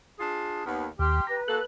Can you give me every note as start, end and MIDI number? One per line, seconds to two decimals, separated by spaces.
0.19 0.63 62
0.19 0.63 65
0.19 0.63 68
0.65 0.87 39
0.65 0.87 59
0.99 1.20 39
0.99 1.37 67
0.99 1.24 84
0.99 1.24 89
1.27 1.63 71
1.27 1.44 82
1.48 1.59 58
1.48 1.59 66
1.48 1.59 69
1.48 1.65 90